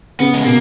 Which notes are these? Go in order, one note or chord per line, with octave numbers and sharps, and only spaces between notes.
C#3 B3
G#3
B2 A#3